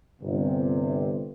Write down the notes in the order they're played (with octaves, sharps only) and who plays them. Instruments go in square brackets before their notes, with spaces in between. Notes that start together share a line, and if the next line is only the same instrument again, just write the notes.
[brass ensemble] G1 C3